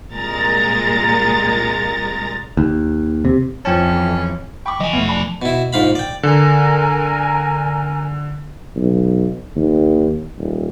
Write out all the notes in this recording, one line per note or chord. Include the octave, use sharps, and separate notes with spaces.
C2 A#2 G#3 A#4 A#5 A6
D#2
C3
F2 E3 F3 C#4 G5 A5
G5 B5 C#6 D6
F3 D#5 G#5
E1 B1 A3 B3 C#4 E4
D4 B5
B2 E4
A#1 G#2 F5 B5
D5 G5
D3 A#4 G#5
B1
D#2
D#1